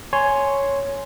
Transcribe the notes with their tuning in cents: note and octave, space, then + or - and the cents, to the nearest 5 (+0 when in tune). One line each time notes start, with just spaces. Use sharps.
C#5 +0 G#5 +10 C6 +0